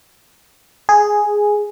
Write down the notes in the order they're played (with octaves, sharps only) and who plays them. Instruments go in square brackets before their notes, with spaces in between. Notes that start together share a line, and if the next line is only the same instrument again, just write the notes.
[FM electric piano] G#4